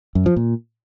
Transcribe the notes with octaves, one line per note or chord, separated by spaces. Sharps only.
F#2
F3
A#2